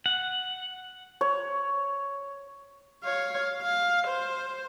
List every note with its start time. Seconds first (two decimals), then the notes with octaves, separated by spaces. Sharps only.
0.06 F#5
1.21 C#5
3.04 C#5 F5
3.62 F5
4.07 C5